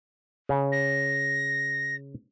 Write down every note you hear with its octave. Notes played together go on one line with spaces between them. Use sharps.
C#3
A#6